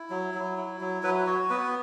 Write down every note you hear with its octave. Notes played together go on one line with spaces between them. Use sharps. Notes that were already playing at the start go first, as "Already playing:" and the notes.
Already playing: E4
F#3
F#3
E4
F#3
F#3 B4
F#4 C#5
B3 B4